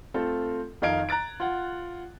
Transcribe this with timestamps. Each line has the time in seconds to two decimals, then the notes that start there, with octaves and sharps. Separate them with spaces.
0.14 A3 C4 F4 A4
0.82 F2 D#3 D#4 F5 G#6 D7
1.09 A#5 F#6 A6 D7
1.40 F4 F#5